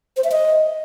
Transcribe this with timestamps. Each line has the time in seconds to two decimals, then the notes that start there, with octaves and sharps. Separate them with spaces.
0.17 C5
0.24 E5
0.32 D#5